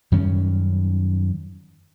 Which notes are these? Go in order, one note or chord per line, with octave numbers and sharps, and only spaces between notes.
F#2 D#3 G3 C#4